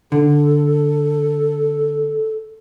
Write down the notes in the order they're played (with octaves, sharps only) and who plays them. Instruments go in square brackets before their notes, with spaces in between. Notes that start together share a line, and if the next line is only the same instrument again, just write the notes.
[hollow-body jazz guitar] D3 [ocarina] A4